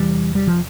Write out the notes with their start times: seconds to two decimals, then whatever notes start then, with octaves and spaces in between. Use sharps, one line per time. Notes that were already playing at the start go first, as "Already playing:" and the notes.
Already playing: E2 C3 E3 G3
0.35 G3
0.47 F3